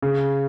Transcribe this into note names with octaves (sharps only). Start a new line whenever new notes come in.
C#3